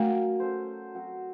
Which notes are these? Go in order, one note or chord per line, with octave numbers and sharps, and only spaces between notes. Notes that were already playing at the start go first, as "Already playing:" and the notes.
Already playing: F#3 A3 A#3 C#4
C#4 A4 C5
F#3 C4 F#4